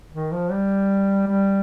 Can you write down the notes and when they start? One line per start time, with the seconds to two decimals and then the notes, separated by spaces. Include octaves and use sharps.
0.13 D#3
0.32 F3
0.51 G3
1.27 G3